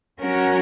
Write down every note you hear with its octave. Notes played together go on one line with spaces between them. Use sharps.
F#3 C#4 F#4 A#4